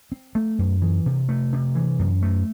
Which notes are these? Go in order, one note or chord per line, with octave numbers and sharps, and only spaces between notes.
C4
A3
F#2
E3
C3
A3
C3
E3
F#2
A3